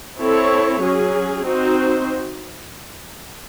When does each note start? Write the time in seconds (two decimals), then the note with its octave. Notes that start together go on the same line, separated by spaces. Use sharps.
0.20 C4 E4 A4 C#5
0.82 F#3 C#4 G#4
1.44 C4 D#4 F#4 C5